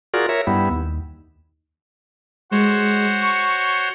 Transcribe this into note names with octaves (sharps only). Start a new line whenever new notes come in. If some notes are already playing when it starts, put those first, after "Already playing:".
F4 F#4 G#4 A#4 D5
A#4 C#5 E5
G2 G3 B3 E4
D#2
G#3 F#4 C5 C#5
C#6